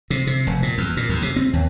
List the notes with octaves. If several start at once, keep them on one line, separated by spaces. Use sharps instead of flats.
C3
C3
F1
A#2
E2
A#2
D#2
C3
C4
D#2